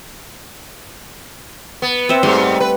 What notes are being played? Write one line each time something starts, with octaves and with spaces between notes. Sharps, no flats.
B3
C4 E5
G#2 G3 A3 C6
B4